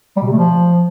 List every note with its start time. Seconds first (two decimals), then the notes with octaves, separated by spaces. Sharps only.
0.16 G3
0.21 B2
0.27 C3
0.32 A3
0.37 F3